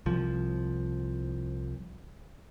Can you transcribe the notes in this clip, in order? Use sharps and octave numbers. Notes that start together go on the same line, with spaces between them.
C2 F3